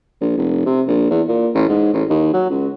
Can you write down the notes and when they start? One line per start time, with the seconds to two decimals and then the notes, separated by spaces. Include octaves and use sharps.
0.21 A#1
0.37 F1
0.66 C3
0.87 A#1
1.10 E2
1.28 A#2
1.54 A1
1.68 G#2
1.93 A1
2.10 D#2
2.33 F#3
2.50 C#2